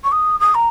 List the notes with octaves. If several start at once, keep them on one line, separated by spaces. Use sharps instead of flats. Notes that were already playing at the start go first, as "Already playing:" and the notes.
C#6
D#6
D#6
A#5